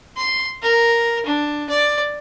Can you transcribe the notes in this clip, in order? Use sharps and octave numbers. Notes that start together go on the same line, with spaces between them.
C6
A#4
D4
D5